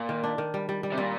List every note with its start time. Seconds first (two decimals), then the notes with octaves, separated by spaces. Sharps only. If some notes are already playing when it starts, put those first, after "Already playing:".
Already playing: A#2
0.09 D#3
0.23 D4
0.38 D#3
0.54 G3
0.69 G3
0.83 G3
0.92 C3
0.98 A#2 G3